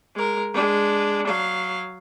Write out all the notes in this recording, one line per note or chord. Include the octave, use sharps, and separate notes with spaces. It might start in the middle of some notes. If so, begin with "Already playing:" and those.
G#3 A#4
G#3 D4
F#3 F5